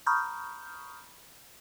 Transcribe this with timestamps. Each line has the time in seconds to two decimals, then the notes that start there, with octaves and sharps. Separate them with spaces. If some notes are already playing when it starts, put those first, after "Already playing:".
0.06 A#5 B5 C#6 D#6 F6 G6